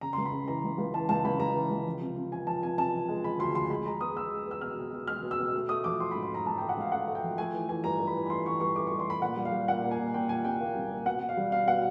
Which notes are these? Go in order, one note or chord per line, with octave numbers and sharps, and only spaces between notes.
C#3 A#5
C#2 C6
B5
C#3
E3 A#5
C#2
C#2
E3 A5
C#2 A5
C#2 B5
C#2 A#5
E3
C#2
F3
C3
C3
F3 G#5
F3 A5
C3 G#5
C3 A5
F3
G#3
G#3 B5
D2 C6
F3 C6
G#3 B5
G#3 A#5
B3 D#6
B3 E6
G#3
B3 E6
B2 F6
B2
B2
G#3 F6
B2
E6
B2
A3
A3 D#6
F3 D6
F3 C6
B5
G#2
C6
G#2 A#5
G#2 A5
A3 G5
F#5
G#2 F5
A3 F#5
A3
G5
F3
A3 G#5
E3
E3 G#5
G2 A#5
G2
B5
E3
B5
A3 C6
E3 C#6
G2 C#6
A3 D6
C#6
G2
C6
A3 B5
A#2 F#5
G3
F5
G3
A#2 F#5
A#3
G#5
A#2
A#2 G5
G3 G#5
C2 G5
A#3 F5
C2
A#3
B2 F#5
B2
F5
G3
B2 F5
B2 F#5